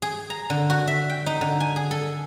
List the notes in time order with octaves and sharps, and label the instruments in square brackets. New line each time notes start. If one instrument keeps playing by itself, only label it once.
[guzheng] G#4
A#5
D3
F#4
E5
G5
D#4
D3
G#5
G#4
A4